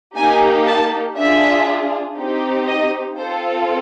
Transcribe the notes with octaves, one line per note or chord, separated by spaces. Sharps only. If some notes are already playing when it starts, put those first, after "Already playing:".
A#3 D#4 G4 G#5
A5
D4 F4 G#4 E5
C4 D#4 G4
D#5
C4 F4 A4 C5